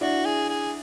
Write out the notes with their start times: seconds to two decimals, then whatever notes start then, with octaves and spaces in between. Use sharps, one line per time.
0.01 D4 E4 F#4
0.25 G#4
0.49 G#4